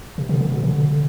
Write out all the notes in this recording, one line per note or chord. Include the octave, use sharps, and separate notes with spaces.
C3
D3
D3
B2
D3